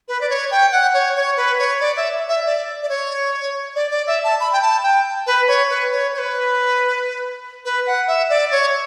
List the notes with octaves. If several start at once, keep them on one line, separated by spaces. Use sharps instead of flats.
B4
D5
C#5
G5
F#5
C#5
C#5
B4
C#5
D5
E5
E5
D5
D5
C#5
D5
D5
E5
A5
B5
G5
A5
G5
B4
C#5
B4
C#5
C#5
B4
B4
F#5
E5
D5
C#5